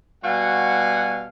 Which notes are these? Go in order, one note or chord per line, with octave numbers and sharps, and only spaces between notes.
B2 G3 F#4 F5 F#5 G#5